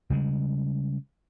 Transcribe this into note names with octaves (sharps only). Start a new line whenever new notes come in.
C#3 G3 G#3